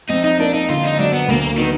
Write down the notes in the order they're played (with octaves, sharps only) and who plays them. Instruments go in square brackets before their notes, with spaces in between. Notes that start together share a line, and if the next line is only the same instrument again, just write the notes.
[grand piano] F2 [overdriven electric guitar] D#4
[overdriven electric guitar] D#4
[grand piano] A#3 [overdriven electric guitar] D4
[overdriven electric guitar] D#4
[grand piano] D3 [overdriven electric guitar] F4
[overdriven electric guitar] D#4
[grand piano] F#3 [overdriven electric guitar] D4
[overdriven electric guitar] B3
[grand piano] D2 [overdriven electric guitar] A#3
[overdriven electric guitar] D#3 [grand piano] B3